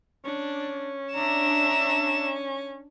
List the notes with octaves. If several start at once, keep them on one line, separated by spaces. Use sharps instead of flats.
C#4 D4
D4 E5 A#5 E7